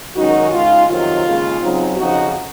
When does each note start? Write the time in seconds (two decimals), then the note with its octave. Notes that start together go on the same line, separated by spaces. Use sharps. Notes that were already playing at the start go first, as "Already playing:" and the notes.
0.15 F#2 D#3 G#3 C#4 D#4 F#4
0.52 C#3 G#3 D#4 F4
0.88 F2 C3 D#3 F#3 F4
1.24 D#2 C#3 G#3
1.61 C#3 F#3 C4 D#4
1.97 F2 C#3 F3 D#4 F#4